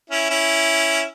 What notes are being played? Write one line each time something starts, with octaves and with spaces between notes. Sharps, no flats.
C#4 E4
C#4 E4